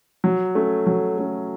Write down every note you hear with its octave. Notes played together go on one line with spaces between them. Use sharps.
F#3
A3 C#4
F#3
A3 C#4